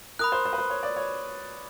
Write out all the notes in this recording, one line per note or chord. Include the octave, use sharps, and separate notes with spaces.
A#4 B5 D#6 F#6
C5
C5
B4
C5
C#5
D5
C#5